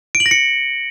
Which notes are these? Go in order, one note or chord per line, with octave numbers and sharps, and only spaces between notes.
D7
F#7
A#6
C#7